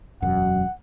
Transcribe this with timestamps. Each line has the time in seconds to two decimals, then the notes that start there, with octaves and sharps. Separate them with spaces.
0.22 E1 F#2 F#3 F#5